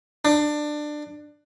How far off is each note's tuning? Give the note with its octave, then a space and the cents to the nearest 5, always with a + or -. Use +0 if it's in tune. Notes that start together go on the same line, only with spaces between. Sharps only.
D4 +20